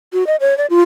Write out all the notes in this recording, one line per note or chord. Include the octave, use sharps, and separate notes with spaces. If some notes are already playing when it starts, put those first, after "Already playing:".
F#4
D#5
C#5
D5
F4